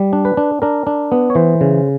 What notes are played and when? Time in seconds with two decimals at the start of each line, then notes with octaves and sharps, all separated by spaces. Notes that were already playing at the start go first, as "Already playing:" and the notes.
Already playing: G3
0.13 D4
0.25 B4
0.37 D4
0.62 D4 A#4
0.87 D4
1.12 B3
1.30 C#5
1.35 E3 C5
1.61 C#3